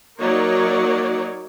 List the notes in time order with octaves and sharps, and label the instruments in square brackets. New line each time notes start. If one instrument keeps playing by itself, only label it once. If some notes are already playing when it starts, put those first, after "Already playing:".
[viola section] F#3 A#3 D#4 A#4 C#5 D5